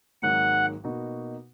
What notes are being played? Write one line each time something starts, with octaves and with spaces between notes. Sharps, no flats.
G#1 G#2 D#3 F#3 A#3 F#5
B2 A#3 D#4 F#4